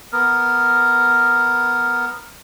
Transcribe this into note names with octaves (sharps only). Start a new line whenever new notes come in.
B3 A#4